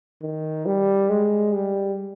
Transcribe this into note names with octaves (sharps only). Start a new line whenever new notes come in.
D#3
G3
G#3
G3